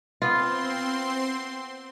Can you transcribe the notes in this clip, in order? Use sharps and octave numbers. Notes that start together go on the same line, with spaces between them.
B3 C4 F4 C6